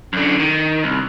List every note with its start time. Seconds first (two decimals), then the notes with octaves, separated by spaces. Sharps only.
0.13 F#2 D3
0.39 D#3
0.84 C2